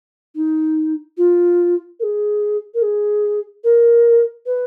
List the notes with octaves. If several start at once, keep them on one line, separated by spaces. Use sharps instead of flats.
D#4
F4
A#4
G#4
A#4
G#4
A#4
B4